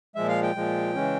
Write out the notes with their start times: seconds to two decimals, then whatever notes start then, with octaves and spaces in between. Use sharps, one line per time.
0.15 A#2 F3 G#3 E5
0.29 F5
0.42 G5
0.55 A#2 F3 G#3
0.95 C#3 E3 G#3 C#4